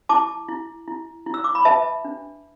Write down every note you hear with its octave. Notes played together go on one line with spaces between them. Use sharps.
E4 A5 D6
E4
E4
E4
E6
D6
B5
B4 E5 A5
D4